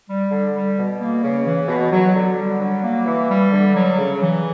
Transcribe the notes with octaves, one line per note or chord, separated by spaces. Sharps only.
G3
D3
G3
B2
A#3
C#3
E3
B2
F#3
D3
G3
F#3
A#3
E3
G3
D3
F#3
C#3
E3